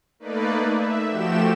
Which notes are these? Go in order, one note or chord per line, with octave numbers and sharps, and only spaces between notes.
A3 A#3 D#4 B4 D5
E5
F3 A3 F#4 G4 G5 E7